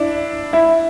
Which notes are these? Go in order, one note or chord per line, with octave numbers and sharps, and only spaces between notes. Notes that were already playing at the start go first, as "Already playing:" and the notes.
Already playing: D4 E4
E4